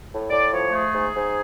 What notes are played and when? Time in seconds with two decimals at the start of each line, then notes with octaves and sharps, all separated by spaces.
0.11 A2
0.30 A2 D5
0.51 F3 C#5
0.71 A3 G#4
0.92 G#2
1.12 G#2